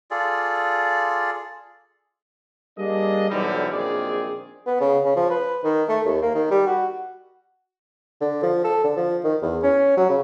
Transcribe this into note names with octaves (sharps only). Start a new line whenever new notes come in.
F4 G#4 A4 D5
G3 A#3 D4 G#4 D#5
B1 G#2 D3 E3 F#3 G3
A#1 F#2 D#3 C4 G#4 D5
B3
C#3
C#3
F3
B4
D#3
A3
D#2
A#3
D#3
G3
F#4
D3
F3
A4
D3
F3
D#3
E2
C#4
F#3
C#3